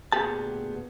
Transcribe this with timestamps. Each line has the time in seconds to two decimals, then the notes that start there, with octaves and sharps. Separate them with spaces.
0.12 D2 A#2 B3 G4 G#4 A5